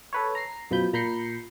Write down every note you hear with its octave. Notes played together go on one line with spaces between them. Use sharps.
A4 B4 C#5
A#5 C7
F#2 B2 F3 B5 G6
A#2 A#5 B5 G6 C7 C#7